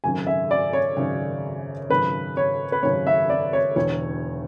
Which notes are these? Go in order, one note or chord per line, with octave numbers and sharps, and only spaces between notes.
G#1 F#2 C#3 G#5
E5
D5
C#5
G#1 F#2 C#3
G#1 F#2 C#3 B4
C#5
B4
G#1 F#2 C#3 C#5
E5
D5
C#5
E1 E2 D3 C#5